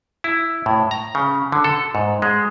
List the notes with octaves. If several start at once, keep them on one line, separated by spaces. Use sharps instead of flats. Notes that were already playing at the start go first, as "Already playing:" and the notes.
E4
A2
A#5
C#3
D3
A4
G#2
G#3